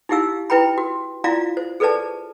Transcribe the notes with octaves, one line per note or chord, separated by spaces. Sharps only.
D#4 E4 G4 F5 E6
E4 B4 G5 A#5 B5
F#4
E4 F4 D5 F5 A#5
C5
G#4 A4 B4 C5 D5 A5